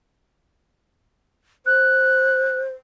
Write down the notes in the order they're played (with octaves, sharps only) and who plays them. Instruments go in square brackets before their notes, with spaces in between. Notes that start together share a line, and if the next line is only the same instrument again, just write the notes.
[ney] C5 [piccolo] F#6